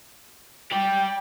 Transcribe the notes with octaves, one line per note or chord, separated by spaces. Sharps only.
G4 D5 G5